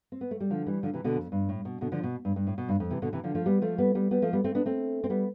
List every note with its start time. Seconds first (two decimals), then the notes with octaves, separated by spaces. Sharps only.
0.12 C4
0.21 B3
0.31 A3
0.40 G3
0.50 D3 F3
0.66 E3 G3
0.83 D3 F3
0.94 C3 E3
1.04 B2 D3
1.16 F2
1.32 G2
1.49 A2
1.65 B2
1.81 B2 D3
1.92 D3 F3
2.03 B2
2.25 G2
2.36 G2
2.47 A2
2.58 B2
2.69 G2
2.80 F2
2.91 C3 E3
3.02 B2 D3
3.13 C3 E3
3.24 D3 F3
3.35 F3 A3
3.46 G3 B3
3.62 F3 A3
3.78 G3 B3
3.95 G3 B3
4.11 G3 B3
4.22 F3 A3
4.33 G3 B3
4.44 A3 C4
4.55 B3 D4
4.65 A3 C4
5.04 C4
5.10 G3 B3